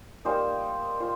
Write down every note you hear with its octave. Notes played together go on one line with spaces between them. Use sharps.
G3 A#3 D#4 C5
F4 C5